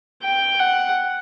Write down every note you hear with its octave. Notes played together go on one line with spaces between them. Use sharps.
G5
F#5